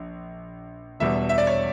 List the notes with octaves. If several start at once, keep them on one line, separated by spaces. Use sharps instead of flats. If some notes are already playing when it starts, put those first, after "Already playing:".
Already playing: A#1
E1 E2 B2 G3 E5
E5
D5
C#5